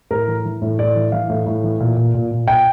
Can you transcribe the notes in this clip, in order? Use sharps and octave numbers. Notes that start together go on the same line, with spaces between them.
A2 A#4
E3
E3
A2
A2 D5
E3
E3 F5
A2
A2
E3
A#2
A#2
A#2
A#2
A#2 G5